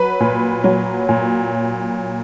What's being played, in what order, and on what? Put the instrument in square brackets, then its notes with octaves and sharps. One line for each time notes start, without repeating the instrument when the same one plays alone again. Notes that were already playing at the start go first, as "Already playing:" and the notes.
Already playing: [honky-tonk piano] F#3 B4
A#2
F#3
A#2